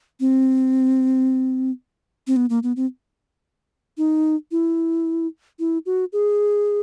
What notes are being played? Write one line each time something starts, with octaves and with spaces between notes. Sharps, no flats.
C4
C4
B3
A#3
B3
C4
D#4
E4
E4
F#4
G#4